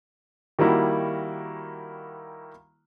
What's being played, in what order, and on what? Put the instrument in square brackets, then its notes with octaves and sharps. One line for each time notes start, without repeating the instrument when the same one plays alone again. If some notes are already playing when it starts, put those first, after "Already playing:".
[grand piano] D#3 G3 A#3 E4 F#4